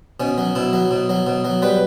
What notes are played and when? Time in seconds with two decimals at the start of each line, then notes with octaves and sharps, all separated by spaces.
0.20 B2 C#4
0.38 F#3
0.55 B2 E4
0.73 F#3
0.91 B2
1.09 F#3
1.27 B2
1.45 F#3
1.62 G3 B4